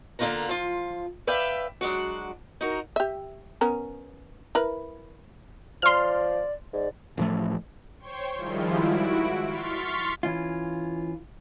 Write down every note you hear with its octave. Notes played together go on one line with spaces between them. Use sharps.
D3 A#3 D#4 F4 A#4 A#5
F3 F4
B4 D5 E5 F5 G5
F#3 G#3 D4 F#4
D#4 F#4 A#4
G4 E5
B3 C#4 A#4
E4 A#4 B4
F3 D5 C6 F6
G#2 D5
A1 A2 F3 A3
C5 C#5 G5 C6 C#6
D#3 F3 G3 G#3 E4 F4
E4 F#4 D7
C6 C#6 F6 A6 B6
E3 C#4 F4